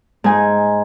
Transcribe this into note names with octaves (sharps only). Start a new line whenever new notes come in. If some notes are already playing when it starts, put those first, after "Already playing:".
G#2 G#5